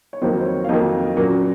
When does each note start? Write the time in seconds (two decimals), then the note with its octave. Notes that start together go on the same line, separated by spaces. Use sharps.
0.13 C#5
0.22 F2 D#3 F#3 A#3 C5
0.40 C5
0.45 C#5
0.64 F5
0.69 F2 D#3 F#3 A#3 D#5
1.17 A#2 F#3 A#3 C#4